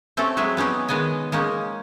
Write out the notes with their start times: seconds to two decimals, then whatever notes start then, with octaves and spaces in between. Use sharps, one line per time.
0.17 A3 C4 C#4 G4 A4
0.37 F#3 G#3 G#4 E5
0.57 B3 C#4 D#4 G4
0.88 D#3 G#3 B3 D#5 G#5
1.32 G#3 A#3 C#4 D#4